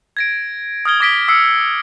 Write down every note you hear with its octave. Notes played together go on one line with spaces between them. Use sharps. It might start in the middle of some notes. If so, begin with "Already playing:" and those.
G#6 A#6 D7
D#6 F6 G#6 G7
D6 D#6 A#6 B6 D7 G7
D#6 E6 C7 C#7